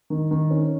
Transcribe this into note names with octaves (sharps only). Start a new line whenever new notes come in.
D#3
D#3
C#4